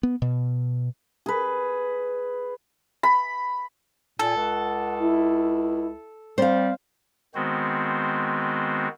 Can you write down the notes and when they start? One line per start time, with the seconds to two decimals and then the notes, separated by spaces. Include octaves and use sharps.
0.03 B3
0.22 B2
1.26 G#4 B4
3.03 B5
4.19 A#2 A4 G#5
4.37 C#2 F#5
5.00 E4
6.38 G3 C4 C5 F5
7.35 D#3 G#3 B3 C4 F#4 C5